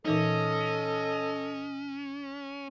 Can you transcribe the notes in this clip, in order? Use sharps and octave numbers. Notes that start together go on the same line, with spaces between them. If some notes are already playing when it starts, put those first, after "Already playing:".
A#2 E3 C#4 D#4 A4 D#5